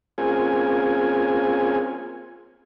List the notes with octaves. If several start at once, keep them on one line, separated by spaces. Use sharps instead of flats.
A#3 C4 C#4 F4 G#4 G#5